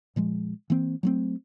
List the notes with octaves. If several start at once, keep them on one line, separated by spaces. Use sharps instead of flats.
A#2 F3 G#3
E3 A#3 C4
F#3 A3 C4